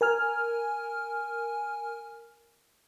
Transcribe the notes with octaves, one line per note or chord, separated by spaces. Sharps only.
A#4 G#5 F6